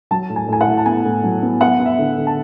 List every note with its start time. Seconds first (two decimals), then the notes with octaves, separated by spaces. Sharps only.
0.11 F#3 A5
0.29 A2
0.36 G#5
0.48 A2 G#5
0.61 F#5
0.67 A2
0.77 A5
0.86 B3 G#5
1.05 A2
1.24 F#3
1.42 B3
1.61 B3 F#5
1.79 B3
1.86 E5
1.98 D3
2.18 D3
2.27 A5